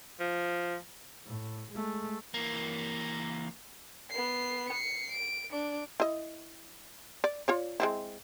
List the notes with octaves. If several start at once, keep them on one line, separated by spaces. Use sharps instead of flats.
F3
A2
G#3 A3
E3 A#3
B3 C7
C7 C#7
D7
D4 D6
E4 D#5
D5
F4 C#5 D5
G#3 C4 E4